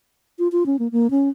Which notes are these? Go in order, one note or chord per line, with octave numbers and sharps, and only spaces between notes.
F4
F4
C#4
A#3
A#3
C#4